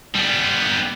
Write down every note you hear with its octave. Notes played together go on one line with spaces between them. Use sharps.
G3 B3